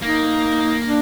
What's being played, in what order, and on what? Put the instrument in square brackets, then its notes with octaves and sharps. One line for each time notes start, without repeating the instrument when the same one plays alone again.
[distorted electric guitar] A#3 [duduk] D#4
[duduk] D4